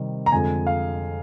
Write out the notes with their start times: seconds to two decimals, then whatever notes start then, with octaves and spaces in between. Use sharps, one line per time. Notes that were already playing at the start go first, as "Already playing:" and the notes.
Already playing: C3 D#3 G3
0.26 A#5
0.32 F2 D3 G#3 G#5
0.67 F5